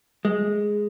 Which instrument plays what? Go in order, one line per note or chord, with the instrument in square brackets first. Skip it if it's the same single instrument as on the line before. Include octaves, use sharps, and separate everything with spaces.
[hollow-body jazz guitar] G#3